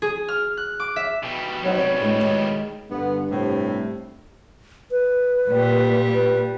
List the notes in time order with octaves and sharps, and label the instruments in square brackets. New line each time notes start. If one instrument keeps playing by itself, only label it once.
[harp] G#4
F6
F#6
D6
E5
[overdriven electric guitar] B2 G3
[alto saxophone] F#3 [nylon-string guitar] D4 D#4 C5
[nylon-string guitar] C3 D5 [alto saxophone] C#5
[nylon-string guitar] A2 G#3 D4
D#3 G#3
[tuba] G2 [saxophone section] D3 B3
[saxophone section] A2 C3
[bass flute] B4
[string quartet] A#2 G3
[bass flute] B4